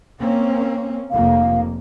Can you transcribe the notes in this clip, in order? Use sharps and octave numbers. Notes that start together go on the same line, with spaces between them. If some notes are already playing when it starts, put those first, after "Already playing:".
A#3 C4 C#4
F1 F2 A#3 F5